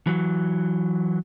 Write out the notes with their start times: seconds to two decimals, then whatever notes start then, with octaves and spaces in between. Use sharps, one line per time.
0.07 E3 F#3